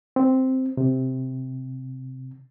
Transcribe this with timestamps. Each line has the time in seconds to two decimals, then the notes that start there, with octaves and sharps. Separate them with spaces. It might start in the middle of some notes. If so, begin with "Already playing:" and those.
0.16 C4
0.77 C3